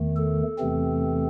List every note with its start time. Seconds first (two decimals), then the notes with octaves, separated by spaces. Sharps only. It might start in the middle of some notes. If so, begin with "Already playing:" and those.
Already playing: E2 D#3 A3
0.17 A4
0.59 E2 C3 E3 A3 C4